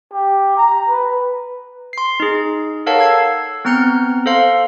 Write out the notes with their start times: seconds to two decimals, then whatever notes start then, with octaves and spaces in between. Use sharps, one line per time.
0.12 G4
0.57 A#5
0.89 B4
1.93 C6 C7
2.20 D#4 G#4
2.86 A4 A#4 C#5 F5 F#5 A5
2.99 E6 G#6 C7
3.65 B3 C4 A#5 F6 G6 C#7
4.26 A4 C5 F5 C6